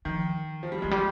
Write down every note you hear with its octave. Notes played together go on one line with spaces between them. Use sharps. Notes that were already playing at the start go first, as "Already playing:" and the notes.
D#3 F3
F3
G3
F3 G#3
G3